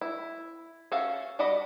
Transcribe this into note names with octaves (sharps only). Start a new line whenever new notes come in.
E4
C#4 F#4 E5 F5 A5
G3 F#4 D5 D#5 B5